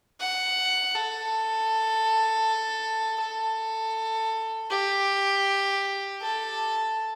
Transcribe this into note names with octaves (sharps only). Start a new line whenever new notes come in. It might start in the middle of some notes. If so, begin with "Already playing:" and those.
F#5
A4
A4
G4
A4